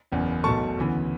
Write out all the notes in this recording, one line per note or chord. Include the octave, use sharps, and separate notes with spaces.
F#1 E2 C#3
B1 B2 A3 A5 C#6
D2 C#3 E3 B3